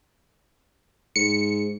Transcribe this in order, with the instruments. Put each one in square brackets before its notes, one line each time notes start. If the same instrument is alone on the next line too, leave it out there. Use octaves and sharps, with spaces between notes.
[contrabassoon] G#2 [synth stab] C#7